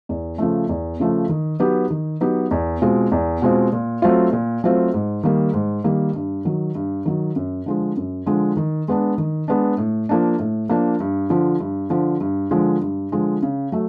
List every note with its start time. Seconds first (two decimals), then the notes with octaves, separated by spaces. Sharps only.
0.09 E2
0.38 C#3 F3 A3
0.69 E2
1.00 C#3 F3 A3
1.29 D#3
1.60 F#3 B3 D#4 G4
1.90 D#3
2.21 F#3 B3 D#4 G4
2.51 E2
2.82 B2 G#3 C4 F4
3.12 E2
3.42 B2 G#3 C4 F4
3.73 A#2
4.02 F#3 A3 C4 F4
4.33 A#2
4.64 F#3 A3 C4 F4
4.94 G#2
5.24 D#3 G3 A#3
5.54 G#2
5.84 D#3 G3 A#3
6.15 G2
6.45 D#3 F#3
6.75 G2
7.06 D#3 F#3
7.36 F#2
7.66 D3 F3 G#3
7.97 F#2
8.26 D3 F3 G#3
8.57 D#3
8.88 G#3 B3 D4
9.18 D#3
9.48 G#3 B3 D4
9.78 A2
10.09 F3 A#3 D4
10.39 A2
10.69 F3 A#3 D4
11.00 G2
11.30 D3 F3
11.60 G2
11.90 D3 F3
12.20 G2
12.51 D3 F3 G#3
12.81 G2
13.12 D3 F3 G#3
13.43 C#3
13.72 F#3 A3